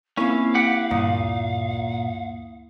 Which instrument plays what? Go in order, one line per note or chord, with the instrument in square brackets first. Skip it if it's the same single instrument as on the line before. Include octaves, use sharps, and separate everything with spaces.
[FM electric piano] A#3 C4 D#4 [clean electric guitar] C#4 [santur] E4 E5 [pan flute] F5
[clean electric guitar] G4 F#5
[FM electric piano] D2 G2 A#3 [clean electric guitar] A#2 [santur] D#6